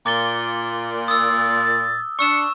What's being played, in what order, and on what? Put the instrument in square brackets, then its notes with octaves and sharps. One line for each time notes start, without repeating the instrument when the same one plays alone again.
[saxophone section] A#2 [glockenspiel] D6 A6 G7
[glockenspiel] D#6 E6 [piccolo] A6
[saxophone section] D4 [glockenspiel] C#6 E6 E7 [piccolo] C#7